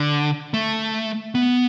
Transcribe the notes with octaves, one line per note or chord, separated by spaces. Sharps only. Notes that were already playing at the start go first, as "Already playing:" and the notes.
Already playing: D3
A3
B3